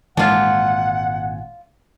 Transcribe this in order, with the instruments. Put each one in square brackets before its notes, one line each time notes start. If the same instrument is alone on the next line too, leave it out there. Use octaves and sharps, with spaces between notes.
[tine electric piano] G#1 A#2 G#5 [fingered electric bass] E3 G#3 [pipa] D4 F4 [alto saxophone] F#5